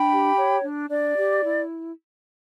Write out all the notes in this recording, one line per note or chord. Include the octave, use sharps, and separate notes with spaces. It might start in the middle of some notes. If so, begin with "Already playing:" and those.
Already playing: D4 G5 B5
G4
C#5
D4
D4 D5
G4
E4